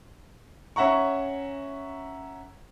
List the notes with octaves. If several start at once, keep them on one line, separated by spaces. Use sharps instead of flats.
C#4 E5 F#5 A#5 C#6